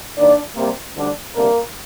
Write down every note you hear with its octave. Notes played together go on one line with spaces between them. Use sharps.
D#2 D#3 A#3 D4 D5
C3 G3 A#3
D2 D3 G3 D4
D2 C3 G3 A#3 D4 A#4